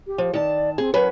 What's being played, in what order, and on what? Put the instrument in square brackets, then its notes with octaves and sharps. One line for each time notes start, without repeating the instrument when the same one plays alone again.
[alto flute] G4
[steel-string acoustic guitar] F3
[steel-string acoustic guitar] D#3 A5 [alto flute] D5
[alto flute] C4 [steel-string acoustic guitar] G#4
[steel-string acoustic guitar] F#3 C#4 B4 [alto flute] A#4